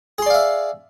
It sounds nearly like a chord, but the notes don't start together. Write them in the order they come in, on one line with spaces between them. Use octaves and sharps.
G#4 C6 D5 F5 E5